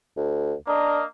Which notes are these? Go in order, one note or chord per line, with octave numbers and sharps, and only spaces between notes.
D2
A#3 D4 A#4 D#5